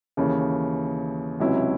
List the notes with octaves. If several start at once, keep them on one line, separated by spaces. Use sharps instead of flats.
D#2 C#3 E3
C#2 C3 F#3 C#4 E4